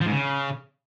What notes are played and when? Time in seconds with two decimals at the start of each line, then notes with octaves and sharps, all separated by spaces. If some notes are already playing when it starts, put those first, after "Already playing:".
0.01 F3
0.06 G#2
0.12 C#3